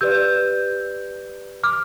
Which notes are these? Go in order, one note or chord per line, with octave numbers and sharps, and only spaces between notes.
G4 B4 D5 E6 G6
D6 F6